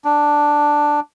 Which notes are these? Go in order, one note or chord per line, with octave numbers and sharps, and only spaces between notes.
D4